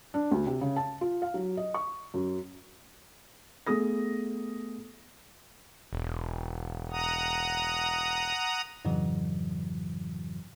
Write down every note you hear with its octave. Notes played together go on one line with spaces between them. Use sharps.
D4
D2
C3
C#3
A5
F4
F5
F#3
D#5
C#6
F#2
A3 B3 G#4 D#6 A#6
E1
F#5 A#5 D#6
F2 G#2 C#3 E3 F#3